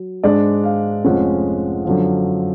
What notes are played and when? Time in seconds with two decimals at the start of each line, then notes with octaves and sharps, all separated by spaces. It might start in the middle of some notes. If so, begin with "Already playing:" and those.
Already playing: F#3
0.23 G#2 G#3 D4 D5
0.64 F5
1.04 F1 F2 F3 G#3 C#4 F#5
1.85 F#2 D3 F3